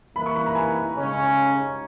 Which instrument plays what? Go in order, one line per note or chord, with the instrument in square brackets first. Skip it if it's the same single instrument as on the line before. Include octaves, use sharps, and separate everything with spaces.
[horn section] E3 A#3 E4 B4 [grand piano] B5
[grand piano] C#6
B5
A#5
G#5
[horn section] C#3 G#3 C#4